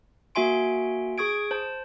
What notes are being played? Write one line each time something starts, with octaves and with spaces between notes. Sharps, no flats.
A#3 F#4 E5 G#5 C6 D7
G#4 C#6 D#6 G#6 D7
C5 A5